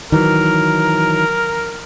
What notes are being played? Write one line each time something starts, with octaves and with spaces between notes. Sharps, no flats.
D#3 E3 F#3 A#4